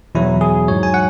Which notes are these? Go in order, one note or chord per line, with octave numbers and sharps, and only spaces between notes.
E2 B2 F#3 E4
G#4
G#2 F#3 C#5
G#5
F#5